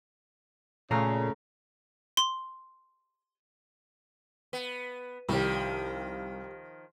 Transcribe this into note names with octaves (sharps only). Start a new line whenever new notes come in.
A#2 C#3 A3 A#5 C7
C6
B3
C2 D#3 F3 G3 A5